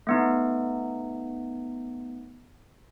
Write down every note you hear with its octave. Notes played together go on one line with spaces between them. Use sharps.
A3 B3 D#4